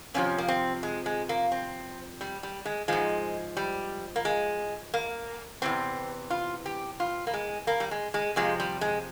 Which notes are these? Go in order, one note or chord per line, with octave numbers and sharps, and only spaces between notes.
F2 C3 F3 C#4
A#3
C4
G#3
G#3
A#3
C4
G3
G3
G#3
G#2 F3 G#3
G3
A#3
G#3
A#3
E2 C3 E3 C4
F4
G4
F4
A#3
G#3
A#3
G3
G#3
G#3
F2 C3 F3 G#3
G3
G#3